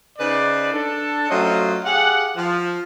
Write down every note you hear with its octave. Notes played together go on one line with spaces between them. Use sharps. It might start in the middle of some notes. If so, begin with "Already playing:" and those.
C#3 D#4 B4 C5 D5
D4 A4
F#3 A3 C#4 F4 C5 D#5
G4 G#4 F5 F#5
F3